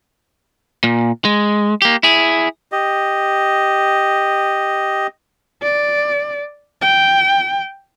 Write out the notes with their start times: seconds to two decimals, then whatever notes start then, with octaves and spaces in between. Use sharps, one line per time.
0.84 A#2
1.25 G#3
1.82 A#3 G4
2.03 E4 G#4
2.72 G4 D#5
5.63 D5
6.82 G5